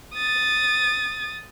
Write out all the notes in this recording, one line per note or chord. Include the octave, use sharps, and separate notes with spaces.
D#6 A6